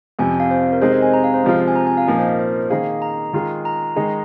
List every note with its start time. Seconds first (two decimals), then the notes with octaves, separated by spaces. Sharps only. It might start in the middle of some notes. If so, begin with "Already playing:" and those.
0.19 F2 C3 F3 G#5
0.40 F5
0.51 C5
0.72 A#4
0.81 C3 G#3 D#4 G#4 C5
0.93 D#5
1.03 G#5
1.14 A#5
1.24 F5
1.34 C5
1.44 C3 F3 G#3 F4 C5
1.68 G#5
1.76 A#5
1.87 G#5
1.97 F5
2.07 A#2 F3 A#3 D#4 D#5
2.19 C5
2.29 A#4
2.39 C5
2.70 D#3 A#3 D#4 G#4 F5
3.02 A#5
3.33 D#3 G#3 F4 G#4
3.65 A#5
3.96 D#3 G#3 D#4 G#4